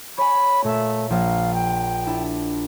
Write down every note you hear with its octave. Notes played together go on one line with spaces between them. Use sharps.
C#5 G#5 B5
A#2 A3 E5
A#1 F5
G5
D4 E4